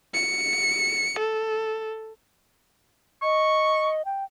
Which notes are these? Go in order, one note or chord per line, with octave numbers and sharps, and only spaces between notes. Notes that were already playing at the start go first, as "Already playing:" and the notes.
C#7
A4
D#5 C#6
G5